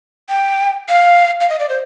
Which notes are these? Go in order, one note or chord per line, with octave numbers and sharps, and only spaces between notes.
G5
F5
F5
D#5
D5
C5